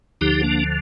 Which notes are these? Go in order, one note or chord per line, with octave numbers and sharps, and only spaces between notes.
D2 D3 F3 D#4 G4
A#3 D4